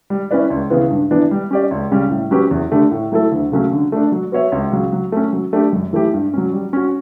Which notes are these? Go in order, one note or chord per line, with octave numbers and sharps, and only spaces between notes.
G3
C#4 E4 B4 D5
C#2
C#3 E3 B3
G2
E3 B3 D4
G3
C#4 G4 D5
C#2
C#3 G3 C#4
A2
F#3 C#4 G4 B4
E2
D3 A3 D4 G4
A2
F#3 A3 E4 A4
D2
C#3 F#3 A3 C#4
D3
A3 D4
F#3
B3 F#4 C#5 E5
C#2
C#3 F#3
F#3
A3 C#4
F#3
A3 D4 G4
F#2
E3 A3 E4 G4
G2
F#3 C#4
G3
C#4 F#4